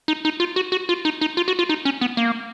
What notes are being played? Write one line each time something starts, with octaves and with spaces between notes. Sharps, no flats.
D#4
D#4
F4
F#4
F#4
F4
D#4
D#4
F4
F#4
F4
D#4
C#4
B3
A#3